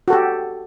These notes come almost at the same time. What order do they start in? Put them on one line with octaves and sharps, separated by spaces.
F#4 A4 G4